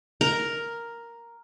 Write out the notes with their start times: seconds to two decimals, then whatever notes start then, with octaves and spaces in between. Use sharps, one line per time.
0.21 A#4